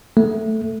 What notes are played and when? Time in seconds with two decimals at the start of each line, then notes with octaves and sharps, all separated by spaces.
0.17 A3